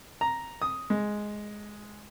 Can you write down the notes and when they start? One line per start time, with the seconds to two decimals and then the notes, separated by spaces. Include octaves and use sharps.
0.21 A#5
0.62 D#6
0.90 G#3